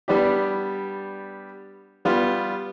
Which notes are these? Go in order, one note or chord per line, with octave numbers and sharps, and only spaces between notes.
G3 B3 D4 G4
G3 B3 F4